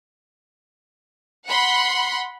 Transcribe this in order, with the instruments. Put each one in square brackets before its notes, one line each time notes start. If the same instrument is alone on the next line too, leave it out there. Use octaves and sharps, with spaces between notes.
[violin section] F#5 B5 C6